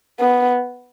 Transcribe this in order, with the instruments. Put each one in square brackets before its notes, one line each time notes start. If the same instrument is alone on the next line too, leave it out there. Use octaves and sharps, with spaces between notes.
[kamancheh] B3